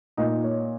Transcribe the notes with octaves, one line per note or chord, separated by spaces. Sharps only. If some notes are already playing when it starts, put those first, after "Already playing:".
A#2 D#4
C#5